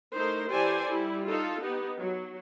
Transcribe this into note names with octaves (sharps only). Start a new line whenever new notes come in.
A3 D#4 E4 A#4 C5
E3 G4 A4 C5 D5 G#5
G3 E4
D#4 F4 A4
B3 D#4 G4
F#3